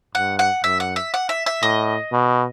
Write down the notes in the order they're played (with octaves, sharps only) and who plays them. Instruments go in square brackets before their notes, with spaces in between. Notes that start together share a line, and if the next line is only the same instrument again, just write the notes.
[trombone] G2 [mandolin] F#5
[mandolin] F#5
[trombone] F#2 [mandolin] E5
[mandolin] F#5
E5
F#5
E5
E5
[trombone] A2 [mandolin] D#5
[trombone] B2